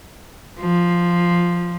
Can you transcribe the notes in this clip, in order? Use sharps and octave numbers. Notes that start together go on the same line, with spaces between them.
F3